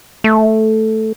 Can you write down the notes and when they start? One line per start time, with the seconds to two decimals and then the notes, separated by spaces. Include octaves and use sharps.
0.24 A3